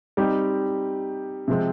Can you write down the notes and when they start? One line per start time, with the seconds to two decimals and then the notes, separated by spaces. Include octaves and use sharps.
0.17 G3 C4 D#4 G4
1.48 C3 F3 G#3 C4